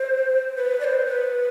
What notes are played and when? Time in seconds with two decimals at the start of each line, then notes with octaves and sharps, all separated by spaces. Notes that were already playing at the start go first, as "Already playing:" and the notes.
Already playing: C5
0.56 B4
0.80 D5
0.84 C5
1.05 B4